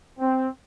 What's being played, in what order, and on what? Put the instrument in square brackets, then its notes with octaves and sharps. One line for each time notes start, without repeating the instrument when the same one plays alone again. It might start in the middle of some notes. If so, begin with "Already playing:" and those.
[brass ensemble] C4